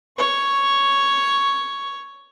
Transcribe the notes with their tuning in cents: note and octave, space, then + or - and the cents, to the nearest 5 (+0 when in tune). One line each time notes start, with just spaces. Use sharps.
C#5 +0 C#6 +0